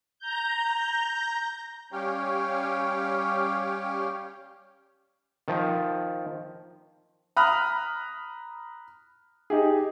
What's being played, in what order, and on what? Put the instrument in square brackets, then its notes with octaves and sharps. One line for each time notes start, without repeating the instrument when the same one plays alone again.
[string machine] A#5 G6
[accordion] G3 C#4 G4 C#5 F5 G5
[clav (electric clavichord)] D#3 F3
[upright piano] A#5 B5 D#6 F6 F#6
D#4 G4 G#4